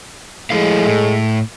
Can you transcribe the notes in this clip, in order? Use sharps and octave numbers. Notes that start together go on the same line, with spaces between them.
F3 G#3 A3 E4 F5
A2